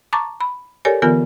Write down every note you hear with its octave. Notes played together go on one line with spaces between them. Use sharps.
A5 A#5 C#6 D6 A6
B5
G4 A4 A#4 C#5 D5 G#5
D3 E3 B3 F4 A#4 G#5